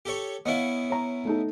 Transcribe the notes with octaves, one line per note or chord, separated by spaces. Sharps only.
G4 A4 C#5
B3 C#4 E4 D#5 F5
C#5 A#5
A3 D#4 A4